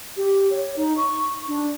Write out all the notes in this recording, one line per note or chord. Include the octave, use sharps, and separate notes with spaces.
G4
C#5
D#4
C#6
D4